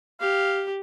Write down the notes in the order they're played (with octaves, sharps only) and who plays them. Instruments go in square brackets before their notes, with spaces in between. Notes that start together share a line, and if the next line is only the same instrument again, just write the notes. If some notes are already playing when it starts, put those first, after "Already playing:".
[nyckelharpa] G4 [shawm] F5